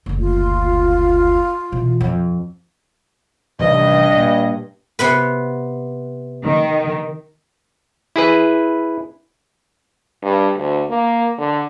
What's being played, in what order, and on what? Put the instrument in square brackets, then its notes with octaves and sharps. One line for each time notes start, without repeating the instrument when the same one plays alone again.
[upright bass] F#1 D2
[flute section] F4
[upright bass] B2 E3
F2
[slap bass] A1 C3 D#3 [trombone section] G2 [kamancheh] D#5
[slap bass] A#2
[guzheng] C3 B3 B4
[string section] D#3
[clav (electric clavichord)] E4 G#4 B4
[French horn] G2
D2
A#3
D3